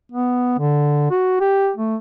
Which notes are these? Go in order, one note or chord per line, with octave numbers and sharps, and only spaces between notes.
B3
D3
F#4
G4
A3